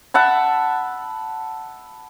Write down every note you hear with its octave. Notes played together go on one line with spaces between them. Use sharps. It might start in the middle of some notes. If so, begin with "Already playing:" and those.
E5 F#5 A5 B5